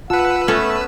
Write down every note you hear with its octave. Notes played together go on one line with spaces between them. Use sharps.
F4 B4 F#5 A5 E6
A3 B3 C#4 A4